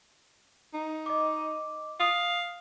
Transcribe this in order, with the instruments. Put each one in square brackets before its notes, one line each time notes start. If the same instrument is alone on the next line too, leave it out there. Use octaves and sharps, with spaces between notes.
[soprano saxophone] D#4
[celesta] D#5 D6
[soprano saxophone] F5 [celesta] D#6